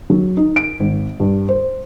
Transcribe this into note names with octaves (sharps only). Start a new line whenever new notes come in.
F#3
D#4
D7
G#1
G2
C5